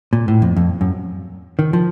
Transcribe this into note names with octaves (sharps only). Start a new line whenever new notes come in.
A#2
A2
F2
F2
F#2
D#3
F3